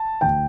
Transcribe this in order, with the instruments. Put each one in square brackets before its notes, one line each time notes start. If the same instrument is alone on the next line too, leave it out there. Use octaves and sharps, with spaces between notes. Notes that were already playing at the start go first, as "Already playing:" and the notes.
Already playing: [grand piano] A5
D2 G5